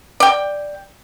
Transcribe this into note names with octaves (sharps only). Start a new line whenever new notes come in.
D5 G5